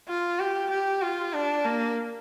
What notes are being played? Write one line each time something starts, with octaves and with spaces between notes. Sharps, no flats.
F4
G4
G4
F4
D4
A#3